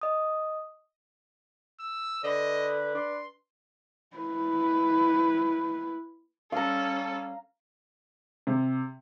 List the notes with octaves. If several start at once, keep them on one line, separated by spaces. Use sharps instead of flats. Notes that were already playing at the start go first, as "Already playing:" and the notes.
D#5 D#6
E6
D3 B4 D#5
D4 C6
E4 B4
G3 C#4 A4 F5 A#5
C3